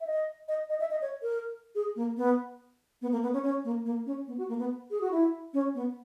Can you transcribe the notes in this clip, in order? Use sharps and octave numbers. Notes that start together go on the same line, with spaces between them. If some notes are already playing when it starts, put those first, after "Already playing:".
E5
D#5
D#5
D#5
E5
D#5
C#5
A#4
G#4
A#3
B3
B3
A#3
B3
C#4
C#4
A#3
A#3
C#4
B3
F#4
A#3
B3
G#4
F#4
E4
C#4
B3